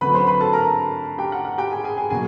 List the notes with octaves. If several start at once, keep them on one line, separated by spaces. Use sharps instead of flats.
D3 F#3 A3 C4 B4 B5
C5 C6
B4 B5
A4 A5
A#4 A#5
G4 G5
F#5
F#5
G4 G5
G#4 G#5
G#4 G#5
G#4 G#5
B2 F#3 A#3 G#4 G#5